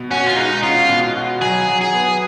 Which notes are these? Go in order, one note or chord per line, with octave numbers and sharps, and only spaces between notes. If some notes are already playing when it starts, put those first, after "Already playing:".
Already playing: B2
C#4 F#4
F4
G#3 D#4
C#4 F4
B2
F#4
F#3 G#4
F#3
G#4
B3